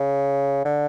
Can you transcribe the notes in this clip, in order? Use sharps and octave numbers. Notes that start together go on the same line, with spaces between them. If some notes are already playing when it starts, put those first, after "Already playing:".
Already playing: C#3
D3